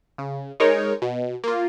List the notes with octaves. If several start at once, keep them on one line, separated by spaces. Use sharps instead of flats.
C#3
G#3 D#4 A#4 C#5
B2
A#3 F4